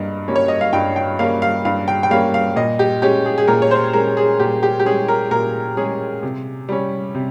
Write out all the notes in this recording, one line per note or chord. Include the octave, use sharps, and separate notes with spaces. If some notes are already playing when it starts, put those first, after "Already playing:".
Already playing: G2 G3 A#3 D#5
G3 A#3 C#4
C#5
D#5
F5
G2 G5
G5
G3 A#3 C#4 F5
F5
G2 F5
G5
G5
G3 A#3 C#4 F5
F5
A#2 D#5
G4
G#3 C#4 G4
G#4
G#4
A#2 A#4
C#5
C5
G#3 C#4 A#4
G#4
A#2 G4
G4
G4
G#3 C#4 G#4
A#4
A#2 A#4
G#3 C#4 G#4
C3
G3 C#4
C3